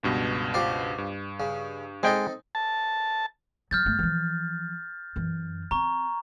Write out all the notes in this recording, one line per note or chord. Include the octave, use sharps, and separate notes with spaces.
C#2 G2 B2
F4 G4 C5
G2
C#3
G#3 C4 D#4 A4 G5
A5
F#3 F6 G6 A6
G2 A3
E3 F3
F#2 E3
C4 A#5 C#6